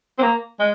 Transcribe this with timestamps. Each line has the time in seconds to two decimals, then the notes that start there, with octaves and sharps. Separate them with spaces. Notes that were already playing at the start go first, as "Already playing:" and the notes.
0.19 C4
0.22 A#3
0.60 G#3